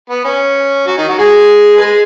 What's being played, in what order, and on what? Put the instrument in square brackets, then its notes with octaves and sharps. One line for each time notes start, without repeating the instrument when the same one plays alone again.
[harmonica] B3
C#4
F#3 F#4
D#3 D#4
F#3 F#4
G#3 G#4
B4
G#3 G#4